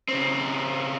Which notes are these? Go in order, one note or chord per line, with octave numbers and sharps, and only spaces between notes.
C#3 C4